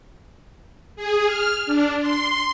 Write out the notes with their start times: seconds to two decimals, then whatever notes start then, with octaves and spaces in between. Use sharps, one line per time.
0.96 G#4
1.26 F6
1.66 D4
2.01 C6